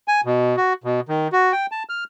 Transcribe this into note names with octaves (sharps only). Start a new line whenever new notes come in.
G#5
B2
F#4
B2
D#3
F#4
G5
A5
F6